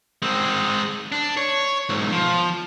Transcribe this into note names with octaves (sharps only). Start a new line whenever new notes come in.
G#3 C4
D4
C#5
B1 G#2
F3